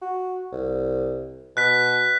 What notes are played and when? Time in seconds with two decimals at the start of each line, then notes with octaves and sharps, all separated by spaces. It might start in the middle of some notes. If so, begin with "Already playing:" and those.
0.02 F#4
0.52 C2
1.57 B2 F#6 B6